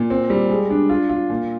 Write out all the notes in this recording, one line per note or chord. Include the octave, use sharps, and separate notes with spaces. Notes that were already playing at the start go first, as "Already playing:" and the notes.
Already playing: A#2
C4
G3
G#3
D4
F4
F4
A#2